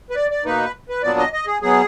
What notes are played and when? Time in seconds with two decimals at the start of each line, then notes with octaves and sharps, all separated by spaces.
0.10 B4
0.16 D5
0.31 D5
0.45 B2 A#3 D#4 B4
0.89 B4
1.03 A#2 F#3 B3 D4 D5
1.18 D#5
1.33 D#5
1.47 G#4
1.61 B2 F#3 B3 G#4